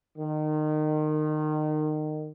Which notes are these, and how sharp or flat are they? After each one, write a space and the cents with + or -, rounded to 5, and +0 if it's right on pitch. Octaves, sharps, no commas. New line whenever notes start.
D#3 -25